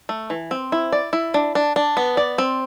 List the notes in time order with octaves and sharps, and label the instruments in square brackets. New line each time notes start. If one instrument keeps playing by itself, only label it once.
[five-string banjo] A3
E3
C4
E4
D5
E4
D4
D4
D4
B3
D5
C4